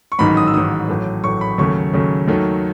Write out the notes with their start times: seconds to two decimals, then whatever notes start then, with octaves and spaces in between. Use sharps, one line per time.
0.12 C#6
0.19 A1 G#2 D#3 F#3 B5
0.37 D#6
0.47 E6
0.53 A1 G#2 D#3 F#3 D#6
0.89 A1 A2 F#3 A3
1.24 A1 A2 F#3 A3 C#6
1.41 B5
1.58 D#2 C#3 F#3 A3 C#6
1.93 D#2 C#3 F#3 A3
2.28 D#2 D#3 F#3 A3